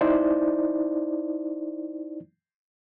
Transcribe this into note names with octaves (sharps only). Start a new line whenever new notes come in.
D#4 E4 C5 D5